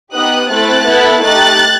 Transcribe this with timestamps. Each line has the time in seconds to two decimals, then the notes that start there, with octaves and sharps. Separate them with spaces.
0.15 B3 D#4 G4 D#6 F#6
0.51 A3 C4 E4 A4 F#6 A6
0.87 B3 E4 A4
1.24 A3 D#4 G4 F#6 A6